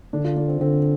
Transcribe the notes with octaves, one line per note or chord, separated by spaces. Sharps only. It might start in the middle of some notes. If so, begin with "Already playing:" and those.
D3 D4
F4
D4
C4
D3 C4